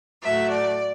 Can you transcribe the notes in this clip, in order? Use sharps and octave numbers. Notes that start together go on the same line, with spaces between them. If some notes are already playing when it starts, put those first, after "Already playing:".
A2 F#3 A3 E5
D5